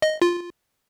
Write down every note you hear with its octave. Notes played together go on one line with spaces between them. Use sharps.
D#5
F4